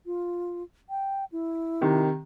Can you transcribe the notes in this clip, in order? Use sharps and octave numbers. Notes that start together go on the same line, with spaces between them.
F4
G5
E4
C3 D#3